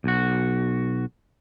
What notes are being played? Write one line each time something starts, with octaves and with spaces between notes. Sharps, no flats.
B1 F#4